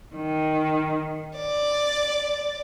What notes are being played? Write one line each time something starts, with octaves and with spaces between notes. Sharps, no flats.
D#3
D5